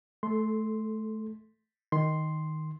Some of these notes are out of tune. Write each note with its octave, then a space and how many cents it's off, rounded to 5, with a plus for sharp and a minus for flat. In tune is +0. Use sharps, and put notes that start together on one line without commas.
A3 -25 A4 +0 C6 +0
D#3 +0 C6 +0